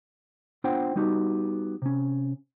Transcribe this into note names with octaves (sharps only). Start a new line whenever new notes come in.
B3 D4 F4 C5 F#5 G5
G3 B3 D#4 F#4 G4
C3 C#4